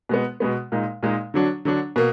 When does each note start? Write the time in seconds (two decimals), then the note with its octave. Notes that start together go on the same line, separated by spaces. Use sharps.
0.09 B2 G#3 B3
0.40 B2 G#3 B3
0.72 A#2 G#3 D#4
1.03 A#2 G#3 D#4
1.34 D3 F#3 D4
1.65 D3 F#3 D4
1.96 B2 A#3